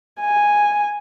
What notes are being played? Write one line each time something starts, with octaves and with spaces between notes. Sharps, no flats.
G#5